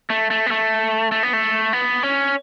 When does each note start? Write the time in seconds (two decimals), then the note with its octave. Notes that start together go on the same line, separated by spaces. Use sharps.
0.10 A3
0.30 A3
0.46 B3
0.51 A3
1.11 A3
1.23 B3
1.33 A3
1.73 B3
2.03 C#4